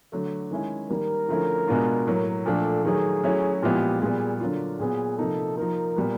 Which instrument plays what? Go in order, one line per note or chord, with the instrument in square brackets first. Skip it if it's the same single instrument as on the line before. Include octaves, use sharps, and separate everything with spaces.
[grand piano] D3 F#3 A3
D#3 G#3 C#4 E4
[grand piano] D#3 G3 A#3 [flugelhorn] A#4
[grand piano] D3 F3 A3 C#4 E4
B2 G#3 B3 D4 F4
A2 F#3 A#3
[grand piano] A#2 F3 A3 D4 [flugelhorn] A4
[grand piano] D#3 F#3 A3 [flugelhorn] G#4
[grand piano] F#3 A3 C#4 E4
[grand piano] A#2 F3 G#3 B3 E4 [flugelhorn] G4
[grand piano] A#2 G3 B3 [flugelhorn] G#4
[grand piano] D3 F#3 A#3 D4 F4
[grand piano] A#2 F#3 B3 [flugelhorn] G#4
[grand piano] C3 F3 A#3 D#4 [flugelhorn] A4
[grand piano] F3 A#3 D#4 [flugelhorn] A#4
[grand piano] A#2 G3 B3